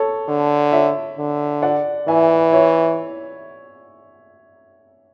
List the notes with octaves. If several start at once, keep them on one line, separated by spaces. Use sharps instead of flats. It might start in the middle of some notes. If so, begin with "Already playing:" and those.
Already playing: A4 C#5
D3
C#5 E5
D3
D5 F#5
E3 E5 G#5
C#5 E5